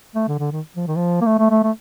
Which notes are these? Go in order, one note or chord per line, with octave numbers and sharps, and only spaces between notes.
A3
D3
D3
D#3
F3
D#3
F3
A#3
A3
A3
A3
A3